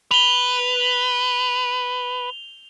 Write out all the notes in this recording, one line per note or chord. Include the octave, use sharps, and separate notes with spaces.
B4 F7 G7